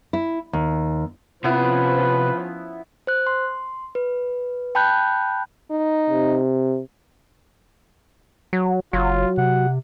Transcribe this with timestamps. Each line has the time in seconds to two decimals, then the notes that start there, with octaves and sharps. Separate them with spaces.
0.13 E4
0.53 D#2
1.44 C3 F3 B3 C#4 E4 B4
3.07 C5 F#6
3.27 C6
3.95 B4
4.75 G5 A5 B5 F#6 G6
5.71 D#4
6.10 C3
8.53 F#3
8.93 F#1 F#3 F4
9.38 C3 F#5